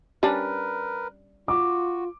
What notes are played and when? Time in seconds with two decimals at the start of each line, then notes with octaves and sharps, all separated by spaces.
0.23 G3 C#4 D4 A#4 B4
1.48 F4 F#4 D6